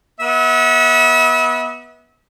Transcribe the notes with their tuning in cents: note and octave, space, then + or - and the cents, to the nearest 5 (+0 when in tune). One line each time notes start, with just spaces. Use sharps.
B3 -20 E5 -40